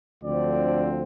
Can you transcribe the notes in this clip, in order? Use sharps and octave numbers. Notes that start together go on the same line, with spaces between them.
D2 D3 F3 C4 D5